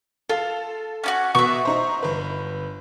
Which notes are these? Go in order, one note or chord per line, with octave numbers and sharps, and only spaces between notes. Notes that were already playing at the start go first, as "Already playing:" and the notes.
F4 A4
C#4 F4 F#4
B2 B3 E5 F#5 C#6
D#4 C5
G1 B4